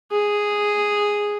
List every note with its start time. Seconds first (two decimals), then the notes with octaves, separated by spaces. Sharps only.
0.11 G#4